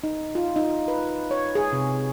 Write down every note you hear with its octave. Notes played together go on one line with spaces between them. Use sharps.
D#4
F4
D#4
B4
C#5
G#4
C3